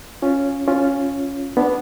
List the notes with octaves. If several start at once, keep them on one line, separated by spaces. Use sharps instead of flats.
C#4 F4
C#4 F4
B3 D4